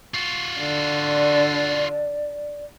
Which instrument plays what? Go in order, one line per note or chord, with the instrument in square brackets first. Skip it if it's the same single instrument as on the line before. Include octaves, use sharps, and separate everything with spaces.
[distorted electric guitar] F4 F#4
[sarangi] D3
[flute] D5